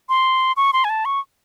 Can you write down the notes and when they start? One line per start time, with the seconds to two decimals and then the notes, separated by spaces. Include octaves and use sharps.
0.09 C6
0.57 C#6
0.73 C6
0.84 G#5
0.90 A5
1.05 C#6